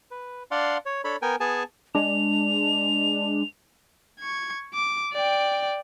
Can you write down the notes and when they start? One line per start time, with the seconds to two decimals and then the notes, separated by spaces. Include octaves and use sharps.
0.11 B4
0.51 D4 D5 F5 F#5 C6
0.86 C#5
1.04 D4 A4 C#5 B5
1.22 B3 A#4 G5 G#5
1.40 B3 G#4 G#5 A5
1.95 G#3 D4 F7
4.20 C#6 G#6
4.74 D6
5.13 D5 G5